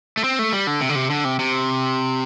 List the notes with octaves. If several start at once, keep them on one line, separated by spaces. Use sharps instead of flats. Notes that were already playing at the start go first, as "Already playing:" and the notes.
A3
C4
A3
G3
D3
C3
D3
C3
D3
C3
C3